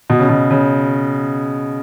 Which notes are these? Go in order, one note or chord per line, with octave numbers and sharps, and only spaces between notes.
B2
C#3
B2
C#3